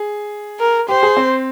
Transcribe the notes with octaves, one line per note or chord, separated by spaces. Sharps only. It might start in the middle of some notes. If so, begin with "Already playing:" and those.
Already playing: G#4
A#4
G4 C5
G#4
C4